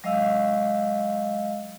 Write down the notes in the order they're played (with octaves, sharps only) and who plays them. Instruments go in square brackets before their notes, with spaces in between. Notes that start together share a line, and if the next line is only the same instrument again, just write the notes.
[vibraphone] F#3 G#3 D#5 F5 E6